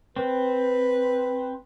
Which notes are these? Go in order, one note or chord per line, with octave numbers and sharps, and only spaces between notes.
C4 B4